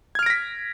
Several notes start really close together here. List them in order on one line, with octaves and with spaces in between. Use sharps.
G#6 F6 D7 A#6 B6